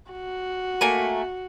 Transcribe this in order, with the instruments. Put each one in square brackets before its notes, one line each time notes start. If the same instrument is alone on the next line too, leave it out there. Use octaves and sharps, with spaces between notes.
[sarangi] F#4
[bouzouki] A3 A#3 G#5